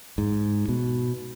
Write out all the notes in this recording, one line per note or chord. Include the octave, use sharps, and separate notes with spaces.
G#2
B2